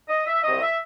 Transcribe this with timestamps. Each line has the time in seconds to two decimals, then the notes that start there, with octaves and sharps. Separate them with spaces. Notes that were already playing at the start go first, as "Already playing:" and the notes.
0.09 D#5
0.26 E5
0.43 C2 C3 F#3 D#5
0.61 E5